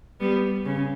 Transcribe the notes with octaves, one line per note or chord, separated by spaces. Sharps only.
G3 B3
C#3